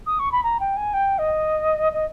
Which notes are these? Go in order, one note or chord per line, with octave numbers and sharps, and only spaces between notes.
D#6
C#6
B5
A#5
G5
G#5
G5
D#5
D#5